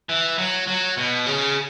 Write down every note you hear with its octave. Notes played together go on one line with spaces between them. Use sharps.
E3
F#3
F#3
B2
C#3